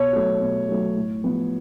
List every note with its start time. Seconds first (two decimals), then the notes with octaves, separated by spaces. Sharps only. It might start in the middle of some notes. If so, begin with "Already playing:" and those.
Already playing: B2 C#5
0.13 F#3 A3
0.40 B2
0.69 F#3 A3
0.96 A2
1.23 F3 B3